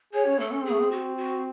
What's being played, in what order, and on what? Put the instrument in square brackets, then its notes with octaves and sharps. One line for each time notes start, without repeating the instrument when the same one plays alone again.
[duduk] G#4 [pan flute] C#5
[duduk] C#4
[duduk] A3 [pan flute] A4
[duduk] C#4
[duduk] C4 [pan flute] G#4
[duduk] A3
C4
[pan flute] F#4
F#4